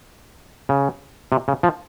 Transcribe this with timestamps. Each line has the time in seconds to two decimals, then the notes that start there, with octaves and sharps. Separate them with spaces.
0.69 C#3
1.32 C3
1.48 C#3
1.63 F3